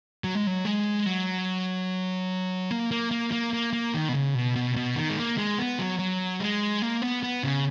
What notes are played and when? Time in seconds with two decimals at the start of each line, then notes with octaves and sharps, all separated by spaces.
0.24 F#3
0.35 G#3
0.47 F#3
0.65 G#3
1.06 F#3
2.71 A#3
2.91 A#3
3.11 A#3
3.32 A#3
3.53 A#3
3.73 A#3
3.94 D#3
4.09 B2
4.14 C#3
4.35 B2
4.56 B2
4.76 B2
4.96 D#3
5.09 G#3
5.17 A#3
5.37 G#3
5.59 B3
5.79 F#3
5.99 F#3
6.40 G#3
6.82 A#3
7.02 B3
7.23 B3
7.43 C#3